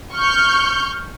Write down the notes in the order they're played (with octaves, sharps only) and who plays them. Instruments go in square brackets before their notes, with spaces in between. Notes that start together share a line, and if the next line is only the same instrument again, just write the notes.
[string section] C#6 F6 G6